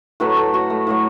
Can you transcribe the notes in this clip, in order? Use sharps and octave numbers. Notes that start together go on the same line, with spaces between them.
A2 F#3 A3 B4
A4
F#4
A3
A2 F#3 A3